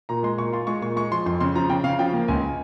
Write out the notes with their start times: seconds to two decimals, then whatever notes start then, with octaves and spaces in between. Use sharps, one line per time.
0.09 A#2 A#5
0.23 G#3 C6
0.38 A#2 C#6
0.53 F4 C6
0.67 G#3 C#6
0.82 A#2 C#6
0.96 G#3 C#6
1.12 F3 C6
1.26 F2 C6
1.40 C#3 C6
1.55 F3 A#5
1.70 C#3 G5
1.84 C#3 F5
1.99 F3 G5
2.13 A#3
2.28 C#2 G#5